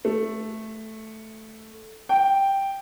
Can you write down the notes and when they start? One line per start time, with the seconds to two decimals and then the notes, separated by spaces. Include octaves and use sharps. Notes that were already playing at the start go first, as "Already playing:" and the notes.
0.05 A3
2.09 G5